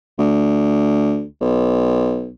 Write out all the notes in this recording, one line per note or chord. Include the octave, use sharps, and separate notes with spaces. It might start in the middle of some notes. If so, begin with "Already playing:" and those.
D2
B1